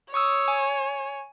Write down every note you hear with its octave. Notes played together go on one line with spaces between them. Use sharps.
C#5 C#6 D#6 E6
G#5